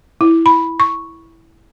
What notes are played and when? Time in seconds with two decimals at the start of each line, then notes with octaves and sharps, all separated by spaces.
0.21 E4
0.46 B5
0.80 C#6